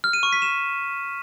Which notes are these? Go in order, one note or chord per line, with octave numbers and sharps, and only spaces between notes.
F6
D#7
C#6
B6
E7